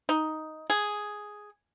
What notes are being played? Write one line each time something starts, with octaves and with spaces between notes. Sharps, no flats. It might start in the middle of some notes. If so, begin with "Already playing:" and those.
D#4
G#4